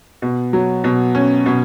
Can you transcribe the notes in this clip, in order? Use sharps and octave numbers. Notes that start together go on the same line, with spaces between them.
B2
F#3
B2
C#4
B2